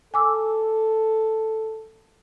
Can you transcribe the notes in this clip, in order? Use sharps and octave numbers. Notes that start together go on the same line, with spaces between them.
A4 G#5 D6 E6